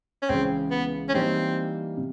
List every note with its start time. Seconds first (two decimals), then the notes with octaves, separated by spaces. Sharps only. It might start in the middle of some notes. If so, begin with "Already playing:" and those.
0.22 C#4
0.29 C#2 C#3 E3 G#3 C4
0.71 B3
1.09 C#4
1.14 E3 G3 A#3 C4 D#4
1.97 C3